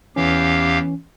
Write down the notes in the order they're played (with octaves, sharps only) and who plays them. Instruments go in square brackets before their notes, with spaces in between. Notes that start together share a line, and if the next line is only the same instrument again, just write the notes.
[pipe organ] E2 G4 F5 [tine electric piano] E3 C#4